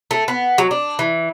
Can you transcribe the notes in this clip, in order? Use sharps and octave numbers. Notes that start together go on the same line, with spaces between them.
A3
B3
F#3
D4
E3